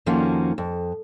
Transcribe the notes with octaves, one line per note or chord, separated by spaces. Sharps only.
F2 D#3 F3 A#3 C#4 F#4
F2